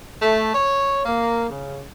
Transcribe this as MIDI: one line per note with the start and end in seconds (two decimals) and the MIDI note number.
0.22 0.53 57
0.54 1.02 73
1.06 1.47 58
1.50 1.81 49